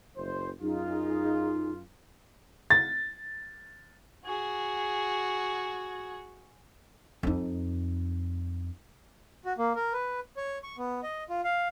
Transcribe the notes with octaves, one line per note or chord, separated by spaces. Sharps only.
F#1 C5
F#2 D#4 F4 G#4
A6
F#4 G#4
F2 D#4
F#4
A#3
A#4
B4
C#5
C#6
B3
D#5
F4
F5